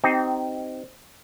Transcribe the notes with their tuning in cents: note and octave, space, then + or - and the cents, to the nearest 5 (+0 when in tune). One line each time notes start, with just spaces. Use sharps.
C4 -10 D#4 +0 G4 -25